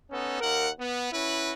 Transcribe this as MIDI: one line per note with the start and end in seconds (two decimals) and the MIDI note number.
0.11 0.40 59
0.11 0.40 61
0.11 0.40 63
0.11 0.40 69
0.41 0.70 39
0.41 0.70 70
0.41 0.70 78
0.79 1.08 59
1.13 1.53 61
1.13 1.53 64
1.13 1.53 66
1.13 1.53 71